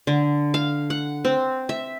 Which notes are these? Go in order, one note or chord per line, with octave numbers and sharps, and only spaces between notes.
D3
F5
F#5
C4
E5